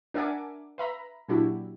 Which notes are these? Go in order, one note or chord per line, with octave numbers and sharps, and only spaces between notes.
D4 A#4 E5 F#5 G#5 D6
B4 E5 A#5 B5
A#2 F#3 D4 E4 F#4 G4